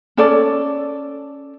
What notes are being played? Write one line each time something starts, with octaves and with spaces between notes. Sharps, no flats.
C#4 A4 D5